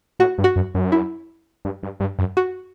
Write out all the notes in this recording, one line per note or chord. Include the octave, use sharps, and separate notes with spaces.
A2 F#4
G2
F#4
F#2
F#2
E4
G2
G2
G2
F#2
F#4